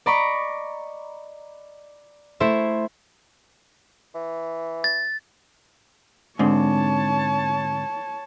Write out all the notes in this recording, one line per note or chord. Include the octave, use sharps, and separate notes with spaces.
D5 D#5 A#5 B5 C#6 D6
A3 E4 C5 E5
E3
A6
G#2 D3 C4 C#5 A5